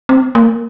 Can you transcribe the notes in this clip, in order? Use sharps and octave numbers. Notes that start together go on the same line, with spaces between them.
C4
A#3